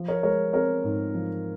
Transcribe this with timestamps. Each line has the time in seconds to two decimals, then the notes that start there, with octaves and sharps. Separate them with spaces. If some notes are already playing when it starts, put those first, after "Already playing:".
Already playing: F3
0.08 A#4 C#5
0.23 G#3 A#4 C#5
0.53 C4 A#4 C#5
0.84 G#2
1.14 F3